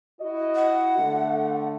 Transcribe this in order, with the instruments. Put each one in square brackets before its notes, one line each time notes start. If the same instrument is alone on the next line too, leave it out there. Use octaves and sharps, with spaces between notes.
[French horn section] E4 F#4 D#5
[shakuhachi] F#5
[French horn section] D3 A3